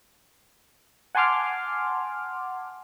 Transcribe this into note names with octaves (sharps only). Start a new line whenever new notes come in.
F#5 G#5 A5 C6 D6 F6